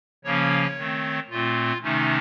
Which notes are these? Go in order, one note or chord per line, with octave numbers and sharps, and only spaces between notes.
C#3 F3 A#3 C#4 C#5
D#3 A3 C4
A#2 A3 C4 F4
C3 D#3 A3 C#4 D#4